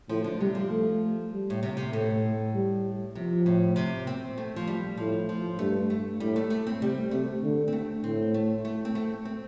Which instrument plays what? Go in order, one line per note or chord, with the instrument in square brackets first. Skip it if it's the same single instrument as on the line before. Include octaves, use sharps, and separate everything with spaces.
[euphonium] A2 [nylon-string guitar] F3
[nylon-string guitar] D3
[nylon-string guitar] C3 [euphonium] G3
[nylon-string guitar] F3
[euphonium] A3
G3
[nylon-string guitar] A2
C3
C3
[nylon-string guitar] A2 [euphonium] A3
[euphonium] G3
[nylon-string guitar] C3 [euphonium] F3
[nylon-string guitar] A2
C3
C4
A3
F3
G3
[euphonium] A2 [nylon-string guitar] F3
[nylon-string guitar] F3
[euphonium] G2 [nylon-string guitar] A3
[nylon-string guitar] A3
[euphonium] A2 [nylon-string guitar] G3
[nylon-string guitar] A3
A3
C4
[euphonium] C3 [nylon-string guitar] G3
[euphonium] C3 [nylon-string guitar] A3
[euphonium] D3
[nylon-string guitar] C4
A3
[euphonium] A2 [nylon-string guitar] C4
[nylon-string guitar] A3
A3
C4
A3
C4